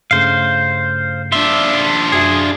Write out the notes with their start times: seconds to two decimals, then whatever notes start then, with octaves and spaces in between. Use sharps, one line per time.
0.11 G2 C#3 A3 C5 F5
1.32 D4 F4 E5
2.12 F#2 F#4 G#4 E5